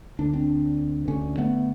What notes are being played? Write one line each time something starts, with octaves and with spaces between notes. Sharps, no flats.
D2 D3 D4
C4 D4
D2 D3 B3 C#4
A3 B3